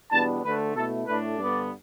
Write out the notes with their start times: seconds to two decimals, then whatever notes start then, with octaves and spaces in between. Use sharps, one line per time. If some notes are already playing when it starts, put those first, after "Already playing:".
0.12 E2 B2 G3 B3 D4 A5
0.43 D2 D3 A3 B4
0.75 B2 A3 E4 A4
1.07 A2 A3 D4 B4
1.39 G2 D3 B3 D5